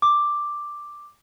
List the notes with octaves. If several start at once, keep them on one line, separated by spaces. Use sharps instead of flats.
D6